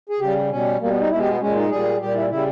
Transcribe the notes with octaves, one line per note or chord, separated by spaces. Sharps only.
G#4
C#3 G3 G4
B2 G3 C#4
B2 G3 A#3
B3
D#4
B2 G#3 E4
G4
B3
A#2 G#3 C#4
D#4
A#2 G3 G#4
A#2 G3 G4
E4
C#3 G3 E4